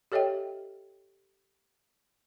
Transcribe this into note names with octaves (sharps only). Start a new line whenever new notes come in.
G4 A4 C#5 D#5 E5 G5